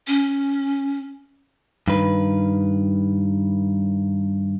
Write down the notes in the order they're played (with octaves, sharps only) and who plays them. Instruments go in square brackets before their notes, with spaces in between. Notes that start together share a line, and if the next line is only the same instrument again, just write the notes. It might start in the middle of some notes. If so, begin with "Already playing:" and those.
[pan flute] C#4
[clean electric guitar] G2 D#3 B4